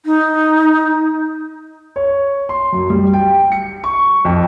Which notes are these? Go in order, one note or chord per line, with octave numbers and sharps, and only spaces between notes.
D#4
C#5
C6
F#2
G3
G5
C#7
C#6
F2